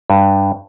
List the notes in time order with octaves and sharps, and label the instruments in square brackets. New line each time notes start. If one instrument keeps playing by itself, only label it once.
[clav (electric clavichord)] G2